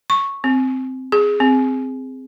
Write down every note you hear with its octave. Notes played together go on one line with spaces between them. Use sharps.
C#6
C4
G#4
C4